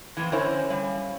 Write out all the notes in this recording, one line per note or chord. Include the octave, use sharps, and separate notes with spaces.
F2 A2 E3
D3 C#4 E4 A#4 C5 G#5
G3 F5